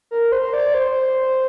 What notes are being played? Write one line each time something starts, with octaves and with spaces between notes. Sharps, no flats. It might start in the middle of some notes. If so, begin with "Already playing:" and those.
A#4
C5
D5
C5